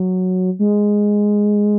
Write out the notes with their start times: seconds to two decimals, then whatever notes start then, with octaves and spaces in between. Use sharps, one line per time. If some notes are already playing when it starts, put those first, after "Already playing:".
Already playing: F#3
0.59 G#3